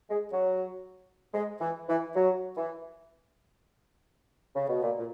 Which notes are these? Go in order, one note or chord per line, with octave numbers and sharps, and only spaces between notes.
G#3
F#3
G#3
E3
E3
F#3
E3
C#3
B2
A#2
A#2